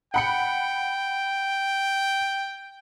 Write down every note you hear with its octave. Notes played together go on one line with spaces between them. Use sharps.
F#5 G5 B5 C#7